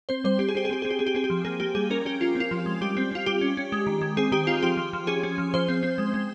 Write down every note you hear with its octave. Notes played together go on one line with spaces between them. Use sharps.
C4 C5
G3 C5
C4 G4
G#4
C4 G4
G#4
C4 G4
C4 G#4
G4
C4 G#4
G4
C4 G#4
G4
F3
A#3 G#4
A#3 G4
G3 G#4
C#4 A#4
C#4 G4
C#4 F4
C4
F4
F3
G#3
G3 G4
C4
C4 F4
G3 G4
C#4
C#4
G#3
D#3
G#3
C4 G#4
D#3 G4
C4 F4
F3 G4
F3
F3
C#4 G#4
C#4
F3
F3 C5
C4
C4
G#3
G#3